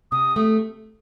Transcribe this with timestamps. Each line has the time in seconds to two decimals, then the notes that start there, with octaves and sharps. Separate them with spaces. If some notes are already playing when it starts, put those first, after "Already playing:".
0.12 C3 D#6
0.36 A3